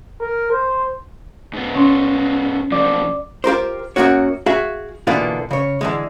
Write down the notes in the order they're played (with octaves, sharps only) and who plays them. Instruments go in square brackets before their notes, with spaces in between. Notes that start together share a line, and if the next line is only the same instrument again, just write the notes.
[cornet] A#4
C5
[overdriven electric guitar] G#2 B3
[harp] C#4 C6
[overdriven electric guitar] B1 F3 [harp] D5
[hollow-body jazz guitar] F4 G4 A#4 C5
F#2 D3 F#3 A#3 F#4 C#5
F#4 G#4 E5 F5
B2 D3 E3 A#3 D4 F4
C#3 C#5
D3 E3 G#3